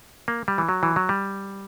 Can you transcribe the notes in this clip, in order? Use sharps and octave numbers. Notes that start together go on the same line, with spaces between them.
A#3
G3
E3
F#3
E3
F#3
G3